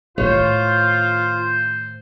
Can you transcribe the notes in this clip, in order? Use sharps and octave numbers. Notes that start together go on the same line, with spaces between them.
A2 D#3 F4 C5 C#5